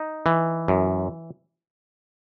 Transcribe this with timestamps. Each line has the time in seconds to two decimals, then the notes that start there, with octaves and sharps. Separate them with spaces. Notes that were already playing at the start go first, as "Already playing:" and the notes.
Already playing: D#4
0.26 E3
0.68 F#2